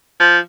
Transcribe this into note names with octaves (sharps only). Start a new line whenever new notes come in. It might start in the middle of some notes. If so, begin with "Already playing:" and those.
F3